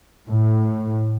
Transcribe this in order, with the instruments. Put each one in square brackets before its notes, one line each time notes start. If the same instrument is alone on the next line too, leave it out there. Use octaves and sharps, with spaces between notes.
[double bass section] A2